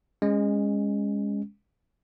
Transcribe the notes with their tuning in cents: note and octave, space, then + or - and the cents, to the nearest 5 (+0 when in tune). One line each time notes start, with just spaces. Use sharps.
G#3 -20 C#4 +0